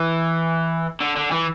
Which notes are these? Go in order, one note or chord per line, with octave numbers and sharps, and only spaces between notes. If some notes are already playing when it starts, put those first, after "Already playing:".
Already playing: E3
D3
D3
E3